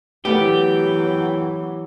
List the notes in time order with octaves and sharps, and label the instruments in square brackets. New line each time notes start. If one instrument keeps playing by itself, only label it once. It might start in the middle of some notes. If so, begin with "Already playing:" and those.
[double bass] E3 F#3 [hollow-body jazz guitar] A3 B3 B4 [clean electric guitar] G4 [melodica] G5